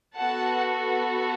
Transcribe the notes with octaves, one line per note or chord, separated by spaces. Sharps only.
B3 F#4 A4 F#5 A5